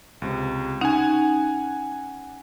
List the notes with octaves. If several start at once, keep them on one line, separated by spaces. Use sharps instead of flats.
C#2 C3
C#4 D#4 F#5 G#5